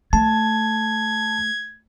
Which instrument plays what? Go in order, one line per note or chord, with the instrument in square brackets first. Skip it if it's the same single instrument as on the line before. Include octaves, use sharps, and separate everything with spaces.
[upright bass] A3 [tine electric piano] A5 [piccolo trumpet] G#6